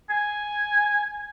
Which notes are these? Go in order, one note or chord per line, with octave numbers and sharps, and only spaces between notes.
G#5